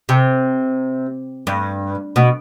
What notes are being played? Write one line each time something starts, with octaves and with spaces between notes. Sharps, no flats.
C3
G2
B2